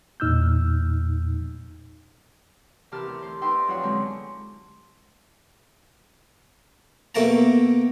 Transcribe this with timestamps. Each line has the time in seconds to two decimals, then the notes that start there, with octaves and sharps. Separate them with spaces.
0.20 E2 A#2 D#4 E6 F6 G6
2.92 C3 E3 G4 A#4 A5 F6
3.07 D2
3.22 C5
3.41 D#4 B4 D5 E5 G5 C6
3.68 F2 F#3 F4 C#5 F#5 C6
3.83 D3 F#3 G#3 C4
7.15 B2 A3 A#3 A5 A#5